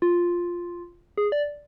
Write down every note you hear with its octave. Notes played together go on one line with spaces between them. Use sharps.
F4
G#4
D5